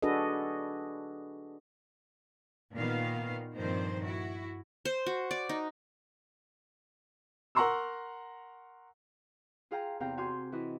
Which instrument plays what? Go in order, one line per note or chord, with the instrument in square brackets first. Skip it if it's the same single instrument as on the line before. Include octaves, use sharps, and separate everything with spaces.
[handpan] D4 F#4 G#4 A4 B4 D#5
[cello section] A#2 D#3 B3 F5
G2 A#2 D#3 F3 C4 C5
E4 F#4
[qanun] C5
F#4
D5
D#4
[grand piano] A#4 F#5 A#5 C6 C#6 E6
[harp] F4 G#4 F5 G5 A#5
E2 C3 F5 G5 A#5
F#4 F5 G#5 C6 D6 G6
E3 E4 F#4 D#5